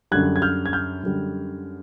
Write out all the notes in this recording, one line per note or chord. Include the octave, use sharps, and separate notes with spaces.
F#2 D3 G3 F#6 G#6
G#6
F6 G6
G#6
F6 G6
F#2 D3 G3